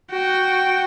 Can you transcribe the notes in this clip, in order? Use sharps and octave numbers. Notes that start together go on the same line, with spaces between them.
F#4 G5